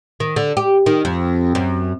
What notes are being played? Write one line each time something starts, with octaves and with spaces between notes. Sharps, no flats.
D#3
D3
G4
D#3
F2
F#2